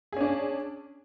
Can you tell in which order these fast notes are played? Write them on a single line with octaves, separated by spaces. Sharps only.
G#4 C#4 D4